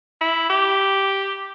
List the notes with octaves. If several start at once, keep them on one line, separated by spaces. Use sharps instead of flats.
E4
G4